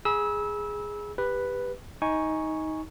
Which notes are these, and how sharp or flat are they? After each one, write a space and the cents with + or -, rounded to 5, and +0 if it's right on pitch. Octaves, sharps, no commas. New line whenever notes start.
G#4 +0 B5 -35 E6 -20
G4 +20 B4 +0
D#4 +15 G#5 +0 C#6 +0